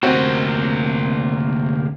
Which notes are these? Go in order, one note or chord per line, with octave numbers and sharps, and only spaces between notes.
D2 C3 A#3 C4 F#4 C5